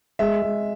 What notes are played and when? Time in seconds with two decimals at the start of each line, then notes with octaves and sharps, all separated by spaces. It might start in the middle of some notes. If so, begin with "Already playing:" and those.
0.19 G#3 E5
0.42 G#3